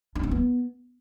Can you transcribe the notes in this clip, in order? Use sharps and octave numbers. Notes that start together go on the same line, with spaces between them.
D4
C#4
B3